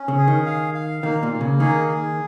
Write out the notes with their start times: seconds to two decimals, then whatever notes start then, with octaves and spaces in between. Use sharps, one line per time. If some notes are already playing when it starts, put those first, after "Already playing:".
Already playing: C#4
0.08 C#3
0.17 G#4
0.28 D#3
0.46 F5
0.74 F5
1.03 D#3 A#3
1.23 A#2
1.32 A#3
1.41 C#3
1.60 D#3 G#4
1.88 G#4